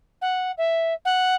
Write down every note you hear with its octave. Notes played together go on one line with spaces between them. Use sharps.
F#5
E5
F#5